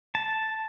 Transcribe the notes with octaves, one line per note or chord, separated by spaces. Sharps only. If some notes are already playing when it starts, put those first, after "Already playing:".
A5